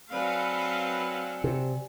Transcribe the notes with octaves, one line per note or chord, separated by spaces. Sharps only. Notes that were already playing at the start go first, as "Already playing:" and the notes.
F#3 C4 A4 B4 D5 F5 G#5
C3